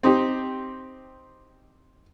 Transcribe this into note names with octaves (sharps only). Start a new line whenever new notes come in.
C4 D#4 G4